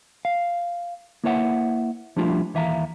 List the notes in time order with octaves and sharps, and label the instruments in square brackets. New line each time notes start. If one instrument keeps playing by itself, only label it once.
[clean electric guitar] F5
A#3 E4 B4 C#5 E5 F#5
F3 G3 A3 D4 E4 F4
D#2 E3 E5 F5 A#5